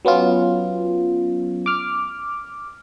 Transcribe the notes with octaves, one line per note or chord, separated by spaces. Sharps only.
F#3 B3 C#4 F4
D6 F6